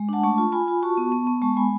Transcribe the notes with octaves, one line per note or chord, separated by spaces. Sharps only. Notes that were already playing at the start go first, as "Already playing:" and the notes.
Already playing: G#3
D4 F#5 A5
A3 A5 C#6
F4
F4 G#5 B5
F4
F#4 A5 C#6
B3
B3
B3
G#3 A5 C#6
G#3 G#5 B5